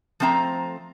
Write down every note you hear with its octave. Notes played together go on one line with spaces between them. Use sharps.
F3 A3 C4 D#5 A#5